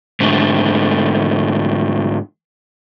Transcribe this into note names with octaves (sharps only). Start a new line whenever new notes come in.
G#2 D3 A3